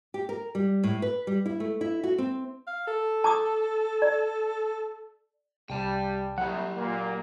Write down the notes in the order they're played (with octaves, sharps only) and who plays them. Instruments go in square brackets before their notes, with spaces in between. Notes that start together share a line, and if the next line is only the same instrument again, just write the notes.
[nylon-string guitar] G4
A#4
G3
A2
B4
G3
E4
A3
E4
F#4
C4
[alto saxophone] F5
A4
[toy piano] A5 D6 D#6
D5
[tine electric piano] C2 [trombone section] G3 [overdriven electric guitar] G5 A5
[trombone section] C2 [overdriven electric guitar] F#3 G4 [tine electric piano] F#5
[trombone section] A#2 A#3